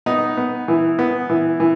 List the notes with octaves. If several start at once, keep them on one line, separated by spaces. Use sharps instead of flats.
B3 D#4
B3
E3
B3
E3
E3